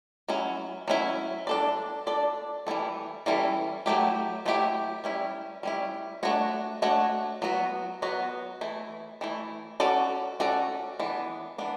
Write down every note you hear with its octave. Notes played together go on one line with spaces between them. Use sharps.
F#3 C#4 E4
F#3 C#4 E4
D4 A4 D5
D4 A4 D5
E3 G3 C#4 E4 A4
E3 G3 C#4 E4 A4
F#3 A3 E4 G4
F#3 A3 E4 G4
G3 C#4 E4
G3 C#4 E4
A3 D4 F#4 C#5
A3 D4 F#4 C#5
F#3 B3 F#4
F#3 B3 F#4
E3 A3 E4
E3 A3 E4
C#4 F#4 A4 D5
C#4 F#4 A4 D5
E3 B3 D4
E3 B3 D4